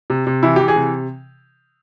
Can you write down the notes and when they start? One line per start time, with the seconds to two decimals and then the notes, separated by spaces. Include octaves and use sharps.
0.10 C3
0.27 C3
0.43 E3 E4
0.56 E3 G4
0.68 G#4
0.76 C3